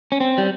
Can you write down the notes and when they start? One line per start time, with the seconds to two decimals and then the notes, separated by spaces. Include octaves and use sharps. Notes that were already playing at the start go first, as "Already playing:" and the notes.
0.12 C#4
0.20 C4
0.38 G3